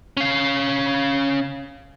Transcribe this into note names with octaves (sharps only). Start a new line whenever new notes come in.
C#4 F5